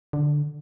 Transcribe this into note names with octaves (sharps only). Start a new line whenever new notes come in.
D3